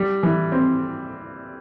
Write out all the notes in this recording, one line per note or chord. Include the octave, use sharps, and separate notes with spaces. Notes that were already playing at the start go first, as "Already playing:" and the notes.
Already playing: G3
E3
C4